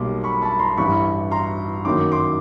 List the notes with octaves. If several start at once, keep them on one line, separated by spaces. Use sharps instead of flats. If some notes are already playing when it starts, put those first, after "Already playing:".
Already playing: B1 B2 G3 A#3 C6 D6
B5 C#6
A5 B5
A#5 C6
A1 G2 E3 B5 C#6
A#5 C6
F#2 D#3 F#3 A#3 C6 D6
C6 D6